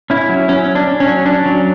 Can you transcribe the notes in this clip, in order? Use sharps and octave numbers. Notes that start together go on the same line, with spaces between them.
C#4 E4
F#3
F#3 C#4
C#4
D4
C#4
C#4
F#3
C#4 D4
F#3